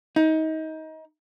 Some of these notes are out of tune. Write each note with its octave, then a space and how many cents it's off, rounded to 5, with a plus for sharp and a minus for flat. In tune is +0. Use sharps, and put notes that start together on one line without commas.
D#4 +25